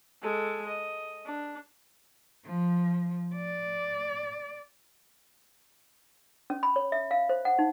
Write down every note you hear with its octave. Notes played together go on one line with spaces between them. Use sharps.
G#3 A4
D#5
D4
F3
D5
C#4
B5
C#5
E5
F5
C5
F#5
D#4